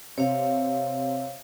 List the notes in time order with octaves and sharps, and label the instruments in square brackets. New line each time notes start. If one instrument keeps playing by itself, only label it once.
[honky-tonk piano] C3 [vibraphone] C#5 F5